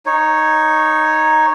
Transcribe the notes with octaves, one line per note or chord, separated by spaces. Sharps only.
D#4 C#5